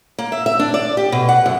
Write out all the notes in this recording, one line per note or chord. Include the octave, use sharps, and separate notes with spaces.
A#3
E5
E5
D4
D5
G4
B2
F#5
F#2